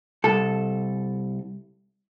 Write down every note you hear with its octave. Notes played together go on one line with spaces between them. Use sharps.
C2 A4